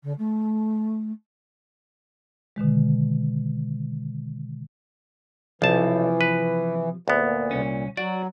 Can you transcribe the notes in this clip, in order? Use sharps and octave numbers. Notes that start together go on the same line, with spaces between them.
D3
A3
B2 D3 D#3 G#3
B1 C3 E3 F3 A5
B4
D2 A#2 B3
C2 C#4
F#3 F#4 D5